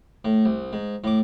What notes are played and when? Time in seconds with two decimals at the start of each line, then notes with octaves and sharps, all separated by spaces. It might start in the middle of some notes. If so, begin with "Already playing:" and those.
0.25 A2
0.45 C2
0.73 G#2
1.04 A2 D6